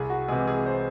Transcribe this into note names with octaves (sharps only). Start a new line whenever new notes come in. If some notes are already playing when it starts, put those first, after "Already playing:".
Already playing: C2 G#4
F#4
C3 E3 G#3 G#4
G#4
C5